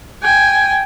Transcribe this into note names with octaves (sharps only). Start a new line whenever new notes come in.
G5 G#5